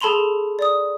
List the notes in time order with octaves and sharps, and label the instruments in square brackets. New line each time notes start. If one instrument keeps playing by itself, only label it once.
[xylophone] G#4 A4 A5 B5 C6 F7
D5 D#6